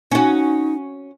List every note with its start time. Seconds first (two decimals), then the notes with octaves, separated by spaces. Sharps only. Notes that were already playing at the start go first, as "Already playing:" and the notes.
0.11 C#4 D#4 F#4